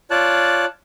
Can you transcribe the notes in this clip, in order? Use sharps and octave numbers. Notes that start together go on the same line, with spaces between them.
F4 C#5 D5 A5 F#6